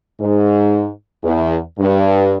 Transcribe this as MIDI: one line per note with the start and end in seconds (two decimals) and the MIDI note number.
0.20 0.87 44
1.23 1.57 40
1.79 2.37 43